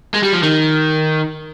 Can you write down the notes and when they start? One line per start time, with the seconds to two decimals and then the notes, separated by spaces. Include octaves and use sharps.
0.14 G#3
0.23 G3
0.33 F3
0.43 D#3